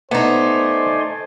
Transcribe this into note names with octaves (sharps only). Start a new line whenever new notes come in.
A3 B3 D#4 C5 D5 G#5 C6